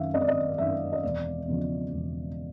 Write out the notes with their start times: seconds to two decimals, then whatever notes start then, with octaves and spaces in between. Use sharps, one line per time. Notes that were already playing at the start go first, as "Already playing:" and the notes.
Already playing: F#2 D#3 E5 F5
0.14 G#1 D#5
0.21 D5
0.28 D#5
0.58 F#2 D#3 E5
0.92 D#5
1.03 E1 D5
1.48 E2 C#3 F3
1.92 E1